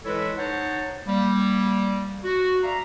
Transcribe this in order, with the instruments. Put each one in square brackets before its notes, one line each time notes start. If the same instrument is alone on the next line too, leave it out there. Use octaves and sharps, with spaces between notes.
[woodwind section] E3 G#3 E4 A4 B4 C#5
D#4 C5 C#5 F#5 A5
G3 A#3
F#4
D5 E5 F5 A#5